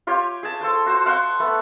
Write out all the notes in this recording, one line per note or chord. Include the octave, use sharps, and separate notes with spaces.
F4 G4 C#5
G#4 A5
A4 C5 G5 A5
F#4 C5
F5 F#5 C6 C#6
A3 B3